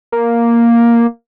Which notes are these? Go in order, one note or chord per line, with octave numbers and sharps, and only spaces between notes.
A#3